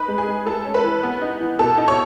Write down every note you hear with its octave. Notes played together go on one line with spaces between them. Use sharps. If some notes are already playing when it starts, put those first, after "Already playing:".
Already playing: D#4 B4 B5
G#3
G#4 G#5
G#3
A3 A4 A5
C#4
B4 B5
E3
B3
D#4
E3
B2 A4 A5
D#4
C#5 C#6